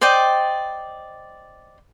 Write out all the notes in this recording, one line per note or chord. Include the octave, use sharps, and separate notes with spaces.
C5 D5 D#5 G5